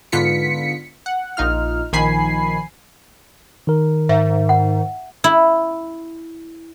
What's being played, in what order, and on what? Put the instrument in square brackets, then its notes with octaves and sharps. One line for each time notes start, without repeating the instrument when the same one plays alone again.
[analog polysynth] G#2 D3 B3 F4 B6 C#7
F#5
A#1 D#4 F4 F6
A#1 D#3 F3 G#5 B5 C7
[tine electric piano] D#3 A#4
[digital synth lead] G#2 [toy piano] E5
[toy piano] F#5
[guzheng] E4